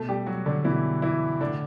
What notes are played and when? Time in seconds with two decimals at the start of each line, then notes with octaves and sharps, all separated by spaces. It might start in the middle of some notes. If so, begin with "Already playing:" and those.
Already playing: B2 A3 A4
0.08 G3 G4
0.26 F#3 F#4
0.46 D3 D4
0.64 B2 E3 E4
1.02 E3 E4
1.40 A2 D3 D4